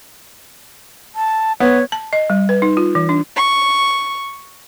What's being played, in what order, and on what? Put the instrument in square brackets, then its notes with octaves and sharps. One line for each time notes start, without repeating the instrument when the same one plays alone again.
[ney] A5
[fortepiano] B3 [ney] C#5
[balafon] A5
D#5
G3
B4
D#4
F4
E3
D4
[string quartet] C#6